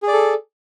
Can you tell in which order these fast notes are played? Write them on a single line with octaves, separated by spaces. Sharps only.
G#4 D5 A4